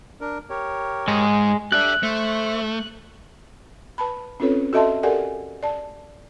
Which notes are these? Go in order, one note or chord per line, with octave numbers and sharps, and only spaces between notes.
D4 A#4
G4 A#4 C#5
G#2 G#3
D4 G4 A4 D5 E5 F#6
A3 C5 E5 C#6
B4 A5 B5
C4 C#4 F4 A4 B4 C#5
F#4 A4 D#5 E5 A5 C6
G4 A4 A#4 D5 F#5 G#5
D5 A5